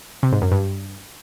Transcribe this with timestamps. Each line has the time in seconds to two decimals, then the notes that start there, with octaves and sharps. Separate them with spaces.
0.23 C3
0.32 G#2
0.42 F#2
0.51 G2